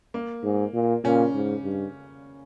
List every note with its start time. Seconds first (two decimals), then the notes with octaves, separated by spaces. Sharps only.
0.14 A#3
0.44 G#2
0.74 A#2
1.04 A#2 C#3 C#4
1.34 G#2
1.64 G2